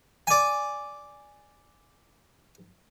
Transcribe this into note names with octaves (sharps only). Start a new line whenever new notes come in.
D5 G#5